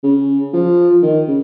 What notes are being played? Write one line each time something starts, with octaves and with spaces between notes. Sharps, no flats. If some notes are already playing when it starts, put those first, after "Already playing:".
C#3
F3
D#3
C#3